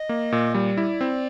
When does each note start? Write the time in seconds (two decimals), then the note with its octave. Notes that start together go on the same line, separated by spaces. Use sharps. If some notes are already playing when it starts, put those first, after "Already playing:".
Already playing: D#5
0.09 A#3
0.32 A#2
0.54 G3 D5
0.77 E4
1.01 C4